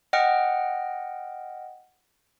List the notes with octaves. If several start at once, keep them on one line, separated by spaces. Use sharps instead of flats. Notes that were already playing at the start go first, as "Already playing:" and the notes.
D#5 F#5 G5 F6